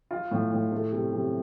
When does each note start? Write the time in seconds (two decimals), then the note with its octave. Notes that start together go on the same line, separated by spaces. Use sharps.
0.11 F4
0.31 A2
0.52 A2
0.72 A3
0.92 C3
1.13 C3